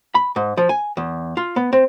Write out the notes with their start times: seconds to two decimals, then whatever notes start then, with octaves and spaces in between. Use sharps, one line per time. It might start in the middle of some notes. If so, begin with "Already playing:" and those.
0.15 B5
0.36 G#2
0.57 F3
0.69 G#5
0.97 E2
1.37 F4
1.56 B3
1.73 C4